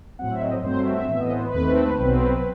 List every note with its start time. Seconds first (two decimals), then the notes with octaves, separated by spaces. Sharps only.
0.19 A2 F#3 C4 F#5
0.31 E5
0.41 D#5
0.53 C5
0.64 G2 F#3 A3 C4 C5
0.79 E5
0.94 E5
1.08 A2 E3 B3 E5
1.20 D#5
1.31 C5
1.42 B4
1.54 D#2 D#3 A3 C4
1.99 B1 B2 F#3 C4